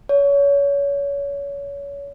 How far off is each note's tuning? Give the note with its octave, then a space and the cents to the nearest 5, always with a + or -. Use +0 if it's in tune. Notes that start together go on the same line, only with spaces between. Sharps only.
C#5 +30